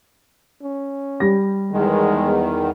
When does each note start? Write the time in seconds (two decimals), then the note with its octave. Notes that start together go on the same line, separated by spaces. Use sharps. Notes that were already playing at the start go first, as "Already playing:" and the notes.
0.62 C#4
1.20 G3 G4 A#6
1.72 E2 D#3 G#3